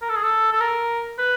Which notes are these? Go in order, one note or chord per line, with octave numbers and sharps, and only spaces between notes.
A#4
A4
G#4
A4
A4
A#4
B4